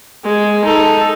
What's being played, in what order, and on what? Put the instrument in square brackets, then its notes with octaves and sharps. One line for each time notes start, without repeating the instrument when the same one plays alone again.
[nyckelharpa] G#3
D#4 A4